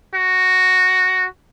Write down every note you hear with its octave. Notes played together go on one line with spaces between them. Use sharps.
F#4